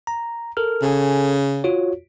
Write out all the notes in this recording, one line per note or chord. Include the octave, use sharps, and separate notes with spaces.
A#5
A4 A#4 F6
C#3 A4 G#5
F4 F#4 C#5